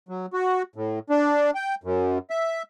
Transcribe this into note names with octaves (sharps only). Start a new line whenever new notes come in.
F#3
F#4
A2
D4
G5
F#2
E5